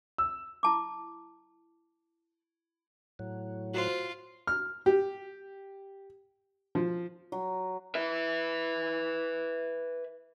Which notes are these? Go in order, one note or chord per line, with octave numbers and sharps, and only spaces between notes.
E6
E4 A5 D6
A2 F#3
F4 F#4 C5
F6
G4
F3
F#3
B4 E5